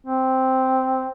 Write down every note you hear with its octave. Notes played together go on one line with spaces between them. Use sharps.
C4